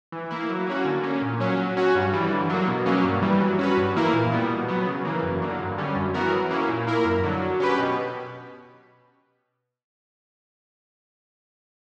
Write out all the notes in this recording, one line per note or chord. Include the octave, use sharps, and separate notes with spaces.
E3
A#3 E4
F#3
A#3 C#4 F#4
D3
A#3 C#4
A#2
F#3 C#4
F#3
C#4 F#4
G2
E3 G3
D3
F#3 A#3
B2
F#3 A#3 C#4
G2
E3 G3
F#3
C#4 F#4 B4
G2
E3 A#3 E4 A#4
A#2
G3 B3
B2
F#3 B3
C#3
E3 A#3
F#2
D3 F#3 A#3
G2
D3 G3 C#4
F#2
E3 B3 F#4 A#4
F#3
A#3 C#4 E4
A#2
A#3 E4 A#4
F#2
D3 F#3
F#3
C#4 G4 B4
B2